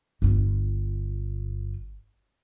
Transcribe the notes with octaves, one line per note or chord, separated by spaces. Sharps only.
G1 F4